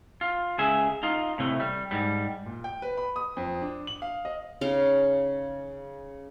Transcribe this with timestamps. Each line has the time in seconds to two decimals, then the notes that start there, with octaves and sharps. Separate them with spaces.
0.21 F4
0.58 C#2 G#4 E5
1.03 D#4 F4
1.38 A2 C3 A3
1.60 G3
1.91 G#2 G3
2.46 A#2
2.64 G5
2.82 B4
2.97 B5
3.16 D#6
3.37 F2
3.62 D4
3.87 F#7
4.02 F5
4.25 D#5
4.61 C#3 D#4 F5 G5